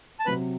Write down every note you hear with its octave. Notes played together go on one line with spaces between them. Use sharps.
A5
C3 F#3 C4 B4 B5